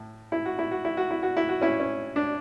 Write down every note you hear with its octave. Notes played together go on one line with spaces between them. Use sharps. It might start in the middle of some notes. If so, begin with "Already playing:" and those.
Already playing: A2
E4
F#4
E4
F#4
E4
F#4
E4
F#4
E4
F#4
C#4 E4
C#4
D4